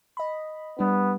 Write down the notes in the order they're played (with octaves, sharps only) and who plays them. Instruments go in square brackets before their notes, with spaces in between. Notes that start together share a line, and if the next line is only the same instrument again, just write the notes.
[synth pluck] D#5 B5
[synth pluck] G3 D4 [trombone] B3